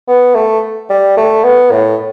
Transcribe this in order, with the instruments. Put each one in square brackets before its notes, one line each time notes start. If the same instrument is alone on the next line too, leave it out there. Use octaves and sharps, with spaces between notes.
[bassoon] B3
A3
G3
A3
B3
A2